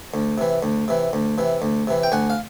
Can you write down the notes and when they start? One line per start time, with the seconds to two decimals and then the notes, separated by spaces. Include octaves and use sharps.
0.14 D2
0.38 C3 E3
0.63 D2
0.88 C3 E3
1.13 D2
1.38 C3 E3
1.62 D2
1.87 C3 E3
2.03 G5
2.12 D2 F#5 G#5
2.30 F5